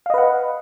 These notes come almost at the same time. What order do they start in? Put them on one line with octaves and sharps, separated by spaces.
F5 D#5 B4 F#5